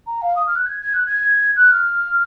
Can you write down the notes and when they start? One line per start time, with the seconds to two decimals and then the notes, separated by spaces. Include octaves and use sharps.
0.07 A#5
0.22 F5
0.36 D#6
0.47 F6
0.56 F#6
0.66 G#6
0.81 G#6
0.94 F#6
1.06 G#6
1.56 F#6
1.71 F6